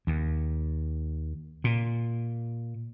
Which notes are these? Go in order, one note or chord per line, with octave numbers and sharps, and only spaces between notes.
D#2
A#2